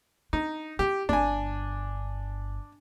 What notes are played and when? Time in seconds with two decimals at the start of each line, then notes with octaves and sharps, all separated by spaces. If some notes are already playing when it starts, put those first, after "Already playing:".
0.33 D4 D#4
0.79 E4 G4
1.09 G1 D4 G#5